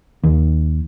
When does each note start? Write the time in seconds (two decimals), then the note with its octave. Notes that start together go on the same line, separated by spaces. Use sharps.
0.24 D#2